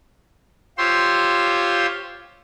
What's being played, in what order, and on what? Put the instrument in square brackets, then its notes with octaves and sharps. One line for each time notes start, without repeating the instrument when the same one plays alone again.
[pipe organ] F4 G4 C5 C#5 C6 E6